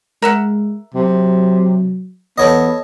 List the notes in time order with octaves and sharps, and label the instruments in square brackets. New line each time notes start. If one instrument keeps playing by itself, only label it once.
[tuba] G#3 [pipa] A#4 E5 F#5
[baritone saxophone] C3 [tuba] F#3
[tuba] E2 [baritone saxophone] B3 [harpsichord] A4 C#5 D#5